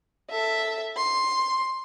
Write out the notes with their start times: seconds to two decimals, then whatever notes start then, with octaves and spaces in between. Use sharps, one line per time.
0.31 A4 E5
0.97 C6